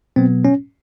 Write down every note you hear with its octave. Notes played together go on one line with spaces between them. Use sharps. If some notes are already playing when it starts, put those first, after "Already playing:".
B2 F#3 B3 C4
C#4